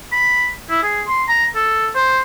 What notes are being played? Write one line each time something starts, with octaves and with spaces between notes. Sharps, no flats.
B5
E4
G#4
C6
A#5
A4
C5